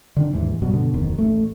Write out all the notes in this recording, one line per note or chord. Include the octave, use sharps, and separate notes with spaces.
D3 D#3 D4
D#2 G#2 E3
G2 B2 F#3
B2 D3
D1 F2 D#3
A1 A3